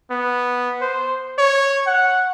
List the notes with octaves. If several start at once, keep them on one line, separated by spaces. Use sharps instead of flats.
B3
C5
C#5
F#5